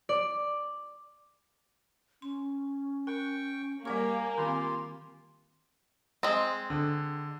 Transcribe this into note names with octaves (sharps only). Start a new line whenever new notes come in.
D5
C#4 C6
A#4 G5 C#6
G3 A#3 G4 A#4 C#5 F#5 G#5 C#6
D#3 C4 F4 G4 C6
G#3 C4
D3